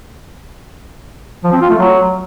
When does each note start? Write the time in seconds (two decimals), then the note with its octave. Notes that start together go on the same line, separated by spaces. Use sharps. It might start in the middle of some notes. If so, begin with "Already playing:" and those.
1.44 F3
1.52 C4
1.61 F4
1.70 A3
1.78 F#3